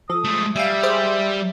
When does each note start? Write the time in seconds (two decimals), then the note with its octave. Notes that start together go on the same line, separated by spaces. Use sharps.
0.10 F3 A4 D#6
0.25 G#3 A3
0.56 G3 E5 F5 G#5
0.83 G#4 C5 D5